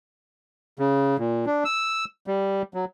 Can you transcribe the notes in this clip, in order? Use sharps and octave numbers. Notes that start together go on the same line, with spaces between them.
C#3
A#2
D4
E6
G3
F#3